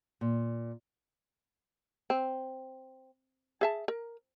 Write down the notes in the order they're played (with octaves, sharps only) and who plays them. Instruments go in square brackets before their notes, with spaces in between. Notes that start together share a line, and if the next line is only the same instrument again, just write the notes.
[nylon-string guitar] A#2
[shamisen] C4
G#4 E5 A5
A#4